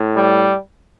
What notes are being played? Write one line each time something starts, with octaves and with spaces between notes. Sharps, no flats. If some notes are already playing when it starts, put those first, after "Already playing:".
Already playing: A2
G3